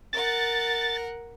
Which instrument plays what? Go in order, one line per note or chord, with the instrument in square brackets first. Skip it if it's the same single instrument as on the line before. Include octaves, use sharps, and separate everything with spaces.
[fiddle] A#4 F#5 [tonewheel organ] A6